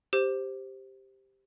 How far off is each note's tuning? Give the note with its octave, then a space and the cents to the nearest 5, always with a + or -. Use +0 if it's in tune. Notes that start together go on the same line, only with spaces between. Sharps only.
G4 +0 C5 +0